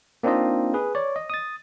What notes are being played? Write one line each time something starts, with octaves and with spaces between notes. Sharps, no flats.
A#3 C4 D4 D#4 F4 D#5
G#4 B4
C#5 D5
D#5
D#6 A6